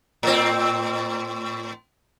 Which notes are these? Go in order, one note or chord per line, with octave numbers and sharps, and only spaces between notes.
A2 C4